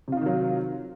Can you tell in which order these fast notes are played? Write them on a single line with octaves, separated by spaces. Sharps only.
C3 F4 D#4 D#3 F#3